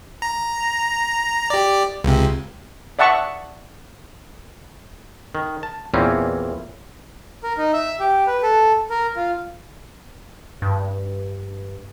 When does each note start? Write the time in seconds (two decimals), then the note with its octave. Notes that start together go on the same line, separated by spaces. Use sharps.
0.22 A#5
1.50 G4 D5
2.04 C#2 C3
2.99 D5 E5 F#5 A5 C#6
5.35 D#3
5.63 A5
5.94 E2 A#2 E3 C4 C#4
7.43 A#4
7.58 D#4
7.73 E5
8.00 G4
8.27 B4
8.43 A4
8.90 A#4
9.16 F4
10.62 G2